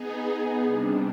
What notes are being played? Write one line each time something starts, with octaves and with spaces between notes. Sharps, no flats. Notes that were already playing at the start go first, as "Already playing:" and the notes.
Already playing: B3 D#4 G#4
C3 G3 D4